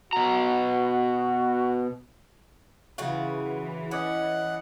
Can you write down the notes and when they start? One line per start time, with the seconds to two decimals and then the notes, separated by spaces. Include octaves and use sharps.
0.13 B2 F#4 A#5
2.98 C#3 E3 F4 F#4
3.91 C#4 D5 D#5 F#5